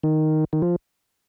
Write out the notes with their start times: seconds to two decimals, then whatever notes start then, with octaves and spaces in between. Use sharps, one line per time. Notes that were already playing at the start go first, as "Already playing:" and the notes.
0.03 D#3
0.53 D#3
0.62 F3